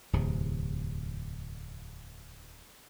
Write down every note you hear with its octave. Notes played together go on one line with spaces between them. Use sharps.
D1 E2 C3